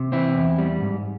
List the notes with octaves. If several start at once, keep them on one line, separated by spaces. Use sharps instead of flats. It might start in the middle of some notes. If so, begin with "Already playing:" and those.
Already playing: C3
E3 C4 E4
E2
G3
G#2